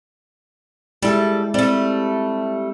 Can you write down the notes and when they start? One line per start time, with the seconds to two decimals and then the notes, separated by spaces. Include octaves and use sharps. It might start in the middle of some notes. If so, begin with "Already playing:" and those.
1.02 G3 G#3 E4 A4
1.54 G3 A3 C4